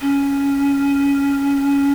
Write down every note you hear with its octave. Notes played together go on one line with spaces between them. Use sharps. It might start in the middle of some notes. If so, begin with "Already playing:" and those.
C#4